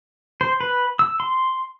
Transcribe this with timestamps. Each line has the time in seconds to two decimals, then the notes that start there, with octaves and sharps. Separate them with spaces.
0.41 C5
0.61 B4
0.99 E6
1.20 C6